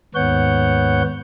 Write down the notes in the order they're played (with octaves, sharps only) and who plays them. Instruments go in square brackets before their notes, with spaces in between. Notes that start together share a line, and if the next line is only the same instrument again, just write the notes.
[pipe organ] D#2 G#2 B3 C#5 F#5 G6